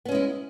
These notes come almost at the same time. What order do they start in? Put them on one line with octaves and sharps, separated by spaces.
B3 C#4 G#3 E4